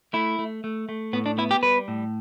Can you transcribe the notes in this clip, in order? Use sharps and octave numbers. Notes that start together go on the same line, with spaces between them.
A3 E4
A3
A3
A3
A2 B3
D4
B3 E4
G4
G3 B4
A2